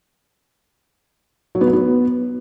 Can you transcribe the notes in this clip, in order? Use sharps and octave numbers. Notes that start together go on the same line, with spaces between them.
F#3
B3
F#3
B3